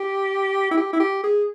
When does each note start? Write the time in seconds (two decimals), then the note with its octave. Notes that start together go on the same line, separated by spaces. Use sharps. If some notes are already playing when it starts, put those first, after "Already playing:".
Already playing: G4
0.71 E4
0.77 G4
0.93 E4
1.00 G4
1.23 G#4